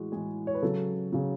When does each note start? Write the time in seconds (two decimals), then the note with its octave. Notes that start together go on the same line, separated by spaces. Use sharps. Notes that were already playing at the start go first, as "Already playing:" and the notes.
Already playing: A2 E3 G#3 F#4
0.12 A2 E3 G#3 G#4
0.47 C#5
0.55 B4
0.62 C#3 F#3 A4
1.12 C#3 F#3